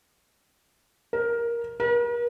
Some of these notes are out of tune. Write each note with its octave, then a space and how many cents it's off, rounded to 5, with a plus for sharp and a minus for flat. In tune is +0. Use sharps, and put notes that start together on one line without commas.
A#4 +10
A#4 +45